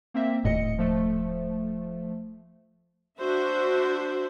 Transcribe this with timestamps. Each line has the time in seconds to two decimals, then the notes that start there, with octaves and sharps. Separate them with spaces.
0.14 A#3 C4 E5
0.45 D#1 A2 D#5 C#7
0.78 F3 A3
3.20 D4 F#4 C5 E5